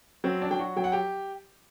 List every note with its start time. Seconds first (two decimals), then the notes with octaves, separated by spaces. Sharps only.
0.24 F#3 C4 C5
0.42 D4 D5
0.51 F#3 G5
0.59 F#4 F#5
0.76 F#3 G5
0.84 F#5
0.92 G4 G5